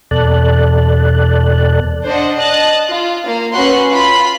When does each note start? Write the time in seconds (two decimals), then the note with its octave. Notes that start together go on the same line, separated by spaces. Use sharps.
0.11 E2 B2 A4 D5 A5 F#6
2.06 D4 C5 D#5 F#5
2.38 D#5 A5 F#6
2.88 F4
3.24 A#3 F5
3.54 C#4 F#4 B4 C6 F#6
3.92 F4 B5 C6